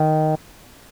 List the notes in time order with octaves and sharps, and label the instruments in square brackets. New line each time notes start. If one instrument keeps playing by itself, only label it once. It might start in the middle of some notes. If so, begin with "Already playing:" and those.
Already playing: [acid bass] D#3